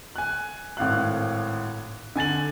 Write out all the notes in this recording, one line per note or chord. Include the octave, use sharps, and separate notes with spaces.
G#5 F#6
G#1 A2 F5 F#6
D3 G#5 A6 F#7